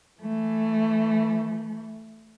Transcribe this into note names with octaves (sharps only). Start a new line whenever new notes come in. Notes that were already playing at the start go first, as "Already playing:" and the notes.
E3 A3